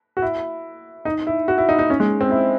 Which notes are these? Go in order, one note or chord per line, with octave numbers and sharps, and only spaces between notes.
F#4
E4
D#4
E4
F#4
E4
D#4
D#4
C#4
G#3
C4
E4